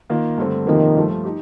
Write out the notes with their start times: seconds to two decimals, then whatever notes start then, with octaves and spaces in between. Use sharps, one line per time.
0.10 D#3 A#3 F4
0.38 G2 D3 A3 C4
0.67 F2 C3 D#3 F3 A#3
0.95 G2 F3 A3
1.24 D#4 G4